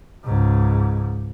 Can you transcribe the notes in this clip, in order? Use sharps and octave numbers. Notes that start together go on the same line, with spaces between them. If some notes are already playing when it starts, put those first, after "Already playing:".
C#2 G#2